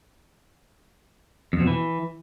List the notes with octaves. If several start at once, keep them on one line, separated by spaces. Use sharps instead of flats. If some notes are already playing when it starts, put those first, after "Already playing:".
F2
B2
E3